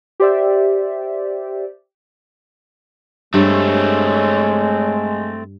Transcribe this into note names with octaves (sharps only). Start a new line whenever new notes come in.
G4 C5 D5 E5
G2 G#3 A3 C4 C#5